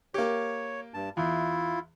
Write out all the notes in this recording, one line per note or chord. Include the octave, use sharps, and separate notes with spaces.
A#3 G4 C#5
G2 A5
E2 E4 F4